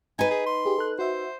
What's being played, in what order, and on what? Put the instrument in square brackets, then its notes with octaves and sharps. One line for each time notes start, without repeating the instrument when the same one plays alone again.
[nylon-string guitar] D#4 B4 [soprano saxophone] G#5
[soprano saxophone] G#4
C6
[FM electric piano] G4 G#4
A4 F#6
[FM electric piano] F#4 E5 [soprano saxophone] C5